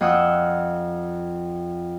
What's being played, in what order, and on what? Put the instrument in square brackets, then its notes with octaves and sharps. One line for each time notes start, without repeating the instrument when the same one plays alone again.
[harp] F2 F4 F#5 D#6 E6 F#6